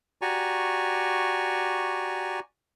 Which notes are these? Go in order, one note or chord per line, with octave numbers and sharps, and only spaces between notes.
F#4 G4 D5 G#5 A#5 C#6